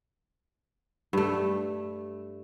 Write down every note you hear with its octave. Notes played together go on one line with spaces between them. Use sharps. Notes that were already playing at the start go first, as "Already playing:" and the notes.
G2 A3